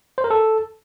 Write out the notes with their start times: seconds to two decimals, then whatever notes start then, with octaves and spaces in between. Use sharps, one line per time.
0.18 C5
0.24 A#4
0.31 A4